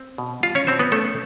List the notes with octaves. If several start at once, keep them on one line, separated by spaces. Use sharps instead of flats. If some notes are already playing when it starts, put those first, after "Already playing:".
Already playing: C4
B2
G3 F4 F5
C#4 C#5
B2 C4 C5
B3 B4
A3 C#4 A4